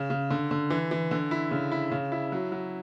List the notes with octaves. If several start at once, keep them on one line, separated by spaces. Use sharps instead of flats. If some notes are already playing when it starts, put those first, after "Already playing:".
Already playing: C#3
C#3
D3
D3
E3
E3
D3
E4
C#3
E4
C#3
E4
F#3
F#3